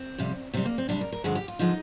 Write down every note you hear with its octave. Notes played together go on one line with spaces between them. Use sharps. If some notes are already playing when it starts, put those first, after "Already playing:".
Already playing: C4
F2 C3 G3
C3 G3 C4
A#3
C4
C3 G3 D4
A#4
A#4
G2 D3 F3 G#3 G#4
G4
F4
D3 F3 G#3 D#4